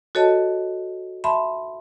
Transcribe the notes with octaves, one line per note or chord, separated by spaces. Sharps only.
F#4 A4 C#5 D#5 A5
E5 A5 B5 C6